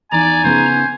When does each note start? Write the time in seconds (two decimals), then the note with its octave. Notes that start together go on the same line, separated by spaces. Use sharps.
0.12 E2 D#4 D5 G#5 A#5
0.44 C#3 B3 G#4 C5